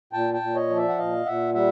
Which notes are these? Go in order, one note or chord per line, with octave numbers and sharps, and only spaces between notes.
A#2 G5 A5
G5 A5
A#2
C#5 D#5
F3
D5 E5
F#5
A#2 D#5 F5
A#2 E5 F#5
G3 E5 F#5